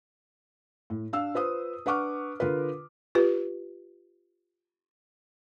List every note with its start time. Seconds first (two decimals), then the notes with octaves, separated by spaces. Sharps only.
0.90 A2
1.13 D4 F5 E6
1.34 F4 B4 C5 D#6
1.86 D4 B4 F#5 C#6 D6 F6
2.40 D3 F4 A#4 B4
3.15 F4 G4 B4